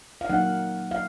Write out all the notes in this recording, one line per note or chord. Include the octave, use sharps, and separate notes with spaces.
F5
F#3 A#3 D#4 F#5
F5